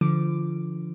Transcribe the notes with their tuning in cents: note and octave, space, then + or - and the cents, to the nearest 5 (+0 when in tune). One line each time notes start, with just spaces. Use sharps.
D3 +0 F3 -25 D6 +0